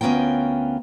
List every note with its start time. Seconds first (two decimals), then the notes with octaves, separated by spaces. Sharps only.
0.01 D2 B3 C#4 F4 A#4 G5